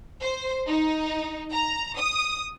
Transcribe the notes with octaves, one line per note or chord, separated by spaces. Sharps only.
C5
D#4
A#5
D#6